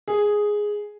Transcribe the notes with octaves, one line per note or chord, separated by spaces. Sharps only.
G#4